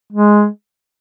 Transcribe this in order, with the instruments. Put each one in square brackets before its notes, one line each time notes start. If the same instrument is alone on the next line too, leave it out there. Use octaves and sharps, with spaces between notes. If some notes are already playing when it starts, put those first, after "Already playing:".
[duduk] G#3